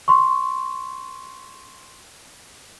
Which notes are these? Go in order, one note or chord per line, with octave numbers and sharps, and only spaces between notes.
C6 C#6